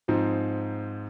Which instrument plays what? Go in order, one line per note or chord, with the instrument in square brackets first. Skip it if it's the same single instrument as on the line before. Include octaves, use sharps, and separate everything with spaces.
[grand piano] G#2 F3 C4 D#4